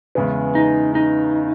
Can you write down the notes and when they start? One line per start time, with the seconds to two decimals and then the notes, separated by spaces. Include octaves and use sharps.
0.15 E2 C#3 G#3 B3
0.55 D#4
0.95 D#4